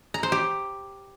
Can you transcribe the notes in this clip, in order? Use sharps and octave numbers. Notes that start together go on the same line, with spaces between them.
A#5
C5
G4